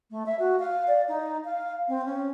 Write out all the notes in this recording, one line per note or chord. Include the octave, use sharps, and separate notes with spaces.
A3
E5
F#4
F5
D5
D#4
F5
C4
C#4